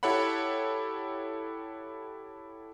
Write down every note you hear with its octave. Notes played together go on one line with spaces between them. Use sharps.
E4 G4 A4 C#5 F#5 B5